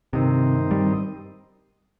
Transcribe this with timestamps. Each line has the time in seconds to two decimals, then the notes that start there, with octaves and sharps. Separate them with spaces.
0.13 G2 C3 D#3 C4 D#4
0.71 G3